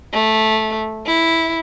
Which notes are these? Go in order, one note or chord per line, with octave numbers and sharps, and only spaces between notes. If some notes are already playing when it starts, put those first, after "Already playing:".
A3
E4